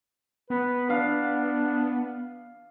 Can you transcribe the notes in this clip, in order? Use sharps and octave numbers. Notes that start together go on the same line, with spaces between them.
B3 B4
D4 F5